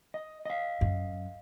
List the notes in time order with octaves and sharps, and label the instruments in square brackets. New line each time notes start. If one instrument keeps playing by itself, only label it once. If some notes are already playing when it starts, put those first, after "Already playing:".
[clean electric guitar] D#5
D#5 F5
[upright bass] F#2